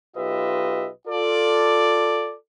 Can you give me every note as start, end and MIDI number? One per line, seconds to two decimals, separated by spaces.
0.16 0.89 35
0.16 0.89 65
0.16 0.89 67
0.16 0.89 71
0.16 0.89 75
0.16 0.89 76
1.07 2.34 65
1.07 2.34 69
1.07 2.34 74